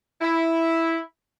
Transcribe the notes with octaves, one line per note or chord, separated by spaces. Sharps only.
E4